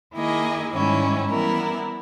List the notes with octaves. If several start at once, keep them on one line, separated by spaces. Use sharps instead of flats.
D#3 A#3 E4 G#4 D#5
G#2 D#3 G3 C#4 E4
E3 G3 B3 E4 A#4